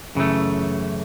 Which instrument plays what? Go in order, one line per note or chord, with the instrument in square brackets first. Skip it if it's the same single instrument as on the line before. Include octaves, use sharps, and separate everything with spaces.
[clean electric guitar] F#2 C#3 E3 A3